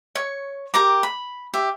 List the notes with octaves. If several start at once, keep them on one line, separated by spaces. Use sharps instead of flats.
C#5 C#6
G4 A#4 A#5 D6
B5
G4 E5